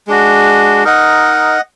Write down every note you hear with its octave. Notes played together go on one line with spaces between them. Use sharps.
G#3 D4 F#4
D#4 A#4 D#5 F#5